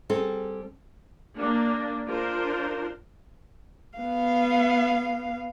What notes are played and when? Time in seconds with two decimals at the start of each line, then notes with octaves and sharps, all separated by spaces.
0.10 G3 C4 G#4 A4
1.37 A#3 D4
2.07 D4 F4 A#4 C5
3.98 B3 F5